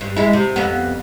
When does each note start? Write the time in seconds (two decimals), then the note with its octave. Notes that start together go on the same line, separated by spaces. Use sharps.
0.01 G2
0.16 G#3 E4
0.33 C3
0.56 F2 B3